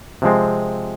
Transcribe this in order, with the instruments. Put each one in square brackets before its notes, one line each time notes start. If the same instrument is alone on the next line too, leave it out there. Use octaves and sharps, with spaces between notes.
[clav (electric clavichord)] C3 F3 G#3 C4